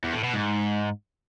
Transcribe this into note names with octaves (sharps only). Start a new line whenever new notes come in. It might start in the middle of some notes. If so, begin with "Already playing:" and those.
E2
A2
B2
G#2